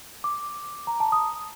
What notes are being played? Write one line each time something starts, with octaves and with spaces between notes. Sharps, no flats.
D6
A#5
A5
D#6